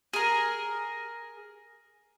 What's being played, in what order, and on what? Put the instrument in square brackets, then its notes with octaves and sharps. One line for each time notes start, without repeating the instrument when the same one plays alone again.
[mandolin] G#4 A#4